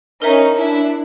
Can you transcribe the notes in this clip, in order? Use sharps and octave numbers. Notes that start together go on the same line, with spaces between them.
C#4 D#4 A#4 C#5 E5
D4 E4